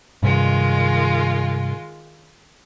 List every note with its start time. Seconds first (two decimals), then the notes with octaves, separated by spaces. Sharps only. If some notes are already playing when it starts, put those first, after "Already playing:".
0.23 G2 C3 D#3 G#3 F4